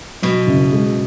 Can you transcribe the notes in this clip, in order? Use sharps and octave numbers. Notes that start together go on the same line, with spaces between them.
B2 F#3
F#1
G#3